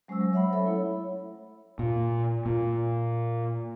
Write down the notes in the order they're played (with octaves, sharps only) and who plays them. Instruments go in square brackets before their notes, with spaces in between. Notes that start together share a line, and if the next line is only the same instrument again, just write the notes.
[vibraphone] F#3 G#3 C#4 C5 C#6 E6
F#3
C#5 E5 F#5 B5
A4 C#5 E5
A3 E4
[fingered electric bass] A#2
A#2